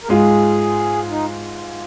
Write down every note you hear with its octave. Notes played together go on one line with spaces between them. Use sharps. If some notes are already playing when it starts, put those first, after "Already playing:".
A#4
G#2 G#3 F4 G#4
D#4